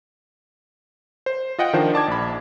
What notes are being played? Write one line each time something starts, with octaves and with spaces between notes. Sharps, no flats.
C5
F4 D#5 F#5 G5
D#3 F3 D4 C5
D5 A5 D6 G#6
A#1 B5